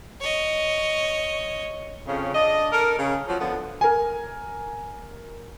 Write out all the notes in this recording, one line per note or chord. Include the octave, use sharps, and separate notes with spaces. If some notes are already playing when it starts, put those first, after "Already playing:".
C#5 D#5
F2 C#3
D4 D#5
A4 A#4
C#3
F3 F#3
D3 F3 B3
A#4 G#5